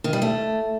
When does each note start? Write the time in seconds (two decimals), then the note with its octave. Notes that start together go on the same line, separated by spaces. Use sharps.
0.04 D#3
0.13 G3
0.22 A3